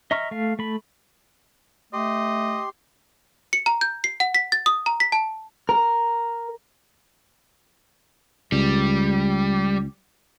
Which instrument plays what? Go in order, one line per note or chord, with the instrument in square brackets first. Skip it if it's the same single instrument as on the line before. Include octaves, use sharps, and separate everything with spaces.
[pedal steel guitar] D#5 E5 A#5 C#6 F6
A3 F5
A3 B5
[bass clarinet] A3 [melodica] G4 C6 [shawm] D#5
[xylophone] C#7
A#5
G6
C7
F#5
B6
A6
D#6
A#5
B6
A5
[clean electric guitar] A#4
[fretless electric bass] C#2 [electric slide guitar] G3